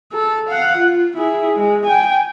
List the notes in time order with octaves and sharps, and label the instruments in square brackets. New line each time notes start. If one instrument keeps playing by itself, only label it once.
[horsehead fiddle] A4
F5 F#5
F4
E4 G#4
G#3
G5 G#5